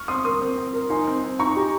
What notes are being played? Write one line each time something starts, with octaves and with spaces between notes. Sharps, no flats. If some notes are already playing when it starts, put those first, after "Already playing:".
Already playing: C#6 F6
C4 C6 D#6
A#4 C6 D#6
C4
C4
A#4
D#4 G#5 C6
C4
C4
D#4 A#5 C#6
G4